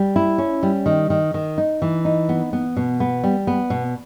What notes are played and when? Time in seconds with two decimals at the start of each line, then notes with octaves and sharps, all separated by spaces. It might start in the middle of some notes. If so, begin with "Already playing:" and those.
Already playing: G3
0.16 E4
0.38 C#4
0.63 G3
0.86 D#3
1.10 D#3
1.34 D#3
1.58 D#4
1.82 E3
2.05 D#4
2.29 B3
2.53 B3
2.77 B2
3.00 B3
3.24 G3
3.47 B3
3.70 B2